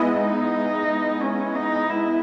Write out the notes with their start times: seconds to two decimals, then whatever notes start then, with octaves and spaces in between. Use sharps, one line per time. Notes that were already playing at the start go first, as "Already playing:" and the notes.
Already playing: G#3 B3 E4 D#5
0.17 D#4
1.21 C#4
1.55 D#4
1.90 E4